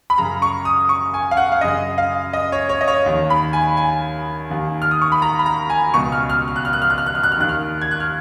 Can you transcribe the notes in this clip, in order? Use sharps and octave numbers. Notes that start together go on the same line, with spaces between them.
B5
F#2 C#3 A#5
C#6
D#6
C#6
G#5
F5
F#5
F5
F#2 C#3 D#5
F5
D#5
C#5
C#5
D#5
C#5
D#2 D#3
B5
G#5
G#5
D#2 D#3
F6
D#6
C#6
B5
A#5
B5
A#5
G#5
C#2 B2 C#6
F6
F6
F6
F#6
F6
F#6
F6
F#6
F6
F#6
F6
F#6
F6
D#2 D#3 F#6
F6
G#6
F#6
F6